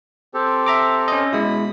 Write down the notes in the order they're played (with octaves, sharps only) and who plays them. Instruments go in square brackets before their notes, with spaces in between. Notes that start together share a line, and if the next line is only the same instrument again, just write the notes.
[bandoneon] C4 G4 A4
[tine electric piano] E5 A#5 D6
C#4 D#5
[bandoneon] B2 B5 D#6 [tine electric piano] G#3 E4